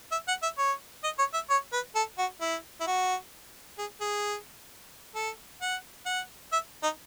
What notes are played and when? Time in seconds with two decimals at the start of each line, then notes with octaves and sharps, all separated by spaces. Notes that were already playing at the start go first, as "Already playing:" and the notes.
0.11 E5
0.28 F#5
0.43 E5
0.58 C#5
1.04 D#5
1.19 C#5
1.33 E5
1.49 C#5
1.72 B4
1.95 A4
2.18 F#4
2.41 E4
2.80 E4
2.87 F#4
3.78 G#4
4.01 G#4
5.15 A4
5.61 F#5
6.06 F#5
6.52 E5
6.83 D#4